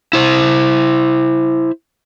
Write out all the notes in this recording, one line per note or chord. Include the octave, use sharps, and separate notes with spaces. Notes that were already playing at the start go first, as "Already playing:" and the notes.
E4 C5